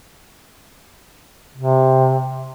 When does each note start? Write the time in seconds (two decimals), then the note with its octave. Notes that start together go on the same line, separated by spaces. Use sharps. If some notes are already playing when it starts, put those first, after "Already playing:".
1.57 C3